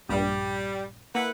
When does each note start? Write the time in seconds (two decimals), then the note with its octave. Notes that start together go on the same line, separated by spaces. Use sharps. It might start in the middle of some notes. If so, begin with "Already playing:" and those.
0.09 A#1 G2 G3
1.15 A#3 E4 B4 F#5